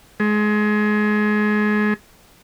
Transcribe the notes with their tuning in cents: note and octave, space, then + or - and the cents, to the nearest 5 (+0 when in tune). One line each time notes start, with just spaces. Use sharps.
G#3 +25